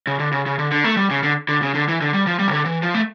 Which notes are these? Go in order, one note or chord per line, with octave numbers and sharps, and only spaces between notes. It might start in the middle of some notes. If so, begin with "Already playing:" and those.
C#3
D3
C#3
C#3
D3
D3
A3
G3
C#3
D3
D3
C#3
D3
E3
D3
G3
F3
G3
C#3
D3
E3
F3
A3